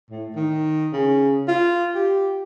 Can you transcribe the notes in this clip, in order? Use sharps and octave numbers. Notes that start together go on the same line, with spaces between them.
A2
D#3
C#3
F4
G4